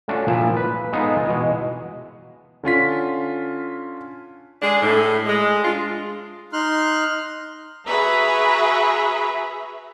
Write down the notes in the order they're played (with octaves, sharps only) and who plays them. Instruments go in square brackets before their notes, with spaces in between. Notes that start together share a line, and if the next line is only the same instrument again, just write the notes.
[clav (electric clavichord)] A3 C#4 D4 F4 F#4
A#2 F3 E4 A5
B4
G#3 B3 D#4 F4 A4
B2 E3 G#3
[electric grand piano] D3 C#4 F4 B6
[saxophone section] G#3 D4 G#4
A2
G#3
D4 F4
[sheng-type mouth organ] D#4 C6 F6 F#6
[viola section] F#4 G#4 B4 E5 A#5